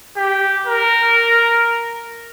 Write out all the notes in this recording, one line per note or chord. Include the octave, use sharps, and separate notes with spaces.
G4
A#4